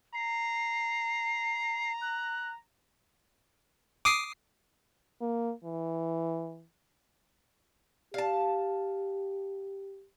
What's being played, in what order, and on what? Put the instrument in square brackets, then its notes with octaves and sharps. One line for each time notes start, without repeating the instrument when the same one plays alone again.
[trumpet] A#5 [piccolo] C7
[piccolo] F#6
[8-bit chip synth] D6 D#6 C7
[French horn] A#3
E3
[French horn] G4 [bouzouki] F5 A5